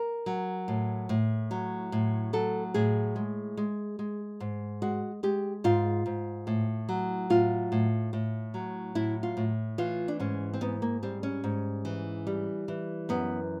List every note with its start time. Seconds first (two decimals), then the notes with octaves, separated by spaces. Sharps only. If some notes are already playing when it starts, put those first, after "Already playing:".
Already playing: A#4
0.26 F#3
0.68 A2
1.09 A2
1.51 F#3
1.92 A2
2.33 F#3 A4
2.74 A2 G#4
3.16 G#3
3.57 G#3
3.99 G#3
4.40 G#2
4.82 G#3 F#4
5.23 G#3 G4
5.64 G#2 F4
6.06 G#2
6.47 A2
6.89 F#3
7.30 A2 F4
7.72 A2
8.13 A2
8.54 F#3
8.95 A2 E4
9.23 F4
9.37 A2
9.78 E3 F4
10.08 D4
10.20 G#2 C#4
10.54 C4
10.61 G#2 B3
10.82 A#3
11.03 G3 C4
11.23 C#4
11.44 G#2
11.85 E3
12.27 G3
12.68 E3
13.09 F#2 B3